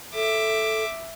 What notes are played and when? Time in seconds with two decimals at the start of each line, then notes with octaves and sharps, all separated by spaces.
0.14 A4 E5 D6